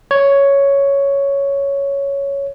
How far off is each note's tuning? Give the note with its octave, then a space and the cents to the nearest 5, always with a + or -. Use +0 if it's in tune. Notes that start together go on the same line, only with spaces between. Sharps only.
C#5 +5